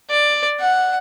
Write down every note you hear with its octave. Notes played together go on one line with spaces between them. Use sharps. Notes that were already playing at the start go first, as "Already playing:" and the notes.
D5
F#5